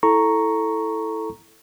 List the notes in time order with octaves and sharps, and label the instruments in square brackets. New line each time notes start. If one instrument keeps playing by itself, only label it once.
[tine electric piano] E4 A4 A#5 C#6